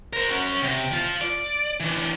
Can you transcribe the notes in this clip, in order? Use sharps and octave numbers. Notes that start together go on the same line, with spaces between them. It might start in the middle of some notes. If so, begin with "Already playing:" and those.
A#4 C5
C#4 F#4
C3
F3 F4
D5
E3 D4